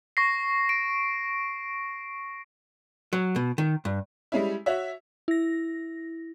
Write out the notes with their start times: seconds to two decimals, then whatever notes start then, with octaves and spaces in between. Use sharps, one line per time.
0.17 C#6 A#6 C7
0.69 D7
3.13 F#3
3.36 B2
3.58 D#3
3.85 G2
4.32 G3 G#3 C#4 E4
4.66 F#4 C#5 E5
5.28 E4 A#6